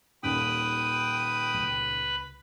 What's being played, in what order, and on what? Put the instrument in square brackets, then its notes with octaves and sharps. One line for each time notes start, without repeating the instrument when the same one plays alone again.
[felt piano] D#1 D#2 [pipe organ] B4 B5 [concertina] G5 D#6
[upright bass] C#2